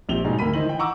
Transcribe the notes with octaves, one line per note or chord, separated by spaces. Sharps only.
A#1 C4 G4 F7 G7
G#2 B2 G3 C4 D#4 G#4
D2 A#4 B5 B6 D#7
D#3 E4 C5 D#5 F#7
E3 G5
F#5 A#5 C#6 D6 E6